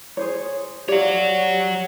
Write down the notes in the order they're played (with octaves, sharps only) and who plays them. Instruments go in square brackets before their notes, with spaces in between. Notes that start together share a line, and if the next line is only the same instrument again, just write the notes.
[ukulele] G#4 C5 C#5
[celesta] G4 [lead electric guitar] C#5 F#5 [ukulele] D5 F5